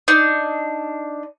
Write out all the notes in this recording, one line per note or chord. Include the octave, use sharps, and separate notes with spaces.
D4 D#4